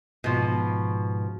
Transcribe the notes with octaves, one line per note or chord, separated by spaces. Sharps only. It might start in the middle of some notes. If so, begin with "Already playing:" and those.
G#2 B2 F3